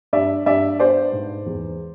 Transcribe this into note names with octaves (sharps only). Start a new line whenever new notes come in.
G2 D5 E5
G2 D5 E5
B3 C5 D5
G#2
E2